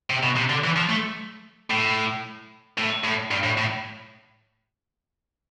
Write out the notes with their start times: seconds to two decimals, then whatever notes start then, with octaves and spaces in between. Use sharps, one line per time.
0.10 C3
0.23 B2
0.36 C3
0.50 D3
0.64 E3
0.76 F3
0.90 A3
1.70 A2
2.77 A2
3.04 A2
3.31 G2
3.43 A2
3.57 A2